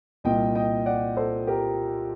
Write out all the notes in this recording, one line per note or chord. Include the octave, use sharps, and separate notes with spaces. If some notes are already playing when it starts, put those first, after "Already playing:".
C2 A#2 D#5 G5
D#5 G5
D5 F#5
A4 C5
G4 A#4